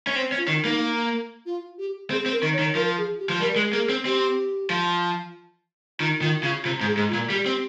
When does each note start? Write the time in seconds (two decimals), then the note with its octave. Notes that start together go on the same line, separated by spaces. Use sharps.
0.07 C#4
0.16 C4 C5
0.32 C#4
0.37 F4
0.48 D#3
0.58 D#4
0.65 A#3
1.46 F4
1.78 G4
2.10 C4 G#4
2.26 C4
2.32 A#4
2.43 D#3
2.53 C#5
2.59 D#3
2.75 F3 A#4
2.98 G#4
3.19 G4
3.29 F3
3.40 G3 A#4
3.56 G#3
3.73 A#3 G#4
3.89 C4
4.05 C4 G4
4.70 F3
5.99 D#3 F4
6.22 D#3 F4
6.43 C#3 F4
6.64 C3 F4
6.81 G#2
6.87 G#4
6.97 G#2
7.09 F4
7.13 A#2
7.30 G3 G4
7.46 C4